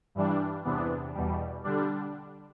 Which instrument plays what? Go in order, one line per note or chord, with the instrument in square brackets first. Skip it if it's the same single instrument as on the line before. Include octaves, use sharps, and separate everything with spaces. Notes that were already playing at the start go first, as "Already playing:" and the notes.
[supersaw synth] G2 E3 G3 D4
E2 C3 E3 B3 D4
E2 B2 G3
D3 G3 D4